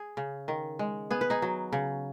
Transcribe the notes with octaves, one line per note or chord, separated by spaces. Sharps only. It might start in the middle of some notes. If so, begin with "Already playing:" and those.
Already playing: G#4
C#3
D#3
G#3
B3 G#4
B4
D#4 G#4
F#3
C#3